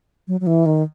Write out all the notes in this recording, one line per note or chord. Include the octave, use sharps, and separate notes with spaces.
F#3
F#3
E3
D#3